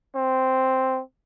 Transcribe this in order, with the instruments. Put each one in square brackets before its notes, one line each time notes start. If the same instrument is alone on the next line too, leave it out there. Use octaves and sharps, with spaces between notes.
[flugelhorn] C4